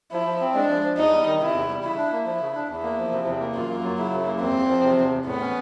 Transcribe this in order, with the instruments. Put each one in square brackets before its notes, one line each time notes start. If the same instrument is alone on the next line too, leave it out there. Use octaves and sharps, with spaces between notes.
[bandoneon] F3 [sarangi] E4
[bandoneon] F3
C4
[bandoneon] G#3 [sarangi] D4
[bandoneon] F3
F3
[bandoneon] E2 [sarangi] D#4
[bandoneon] G3
D#3
[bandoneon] C3 [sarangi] E4
[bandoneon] E2
G3
[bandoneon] C#3 [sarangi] E4
[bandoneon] D4
A#3
[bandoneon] F3 [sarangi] E4
[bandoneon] C#3
D4
[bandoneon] E2 [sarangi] E4
[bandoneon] A#3
F3
C3
E2
A#3
[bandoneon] F#2 [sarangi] F4
[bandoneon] A#3
F#3
[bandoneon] C#3 [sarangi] E4
[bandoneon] F#2
A#3
[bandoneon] E2 [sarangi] C4
[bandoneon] E2
F3
C3
E2
E2
[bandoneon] A2 [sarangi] B3
[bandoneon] C#4